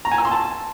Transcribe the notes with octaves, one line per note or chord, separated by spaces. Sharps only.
A#5
G#5
E6
C6
A5